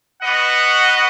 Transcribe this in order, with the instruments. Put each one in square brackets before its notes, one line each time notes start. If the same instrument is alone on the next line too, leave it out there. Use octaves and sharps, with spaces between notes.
[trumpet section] B3 F#4 B4 D#5 F#5